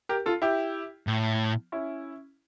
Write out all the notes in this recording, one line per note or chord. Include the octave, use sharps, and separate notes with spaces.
G4 A#4
F4 A4
E4 G4
A2
C#4 E4